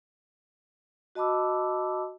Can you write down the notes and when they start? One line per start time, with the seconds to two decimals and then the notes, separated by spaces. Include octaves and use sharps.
1.15 F#4 D#5 A5 B5 D6 E6